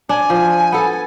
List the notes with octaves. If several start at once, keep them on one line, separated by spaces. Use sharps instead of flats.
D4 G#5
F3
B3 A4